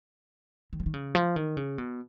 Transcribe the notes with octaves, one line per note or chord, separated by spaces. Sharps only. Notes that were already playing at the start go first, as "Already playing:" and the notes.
D#3
F3
D#3
C#3
F3
D#3
C#3
B2